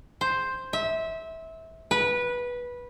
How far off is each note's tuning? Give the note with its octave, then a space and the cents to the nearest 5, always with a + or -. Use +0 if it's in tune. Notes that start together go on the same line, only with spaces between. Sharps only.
C5 +5
E5 -20
B4 -15